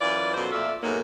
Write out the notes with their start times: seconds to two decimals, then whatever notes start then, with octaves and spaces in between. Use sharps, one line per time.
0.01 F#2 E3 F4 D5
0.34 F#2 B2 F3 A4 C5
0.52 F2 A#2 A3 D5 E5 F5
0.83 G#2 B2 F#3 A3 A#3 D#4